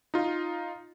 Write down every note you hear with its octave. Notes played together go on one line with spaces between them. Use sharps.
D#4 F4